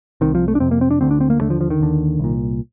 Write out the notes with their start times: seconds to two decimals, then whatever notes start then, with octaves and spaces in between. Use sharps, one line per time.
0.21 C2 C3 D#3
0.35 F3
0.48 A3
0.55 D4
0.60 F2 C3 C4
0.71 A#3
0.81 C4
0.91 D4
1.01 D2 D3 C4
1.11 D4
1.21 C4
1.30 A#3
1.41 D#2 D3 A3
1.50 F3
1.61 F3
1.70 D#3
1.80 D#2 D3
2.19 C2 A#2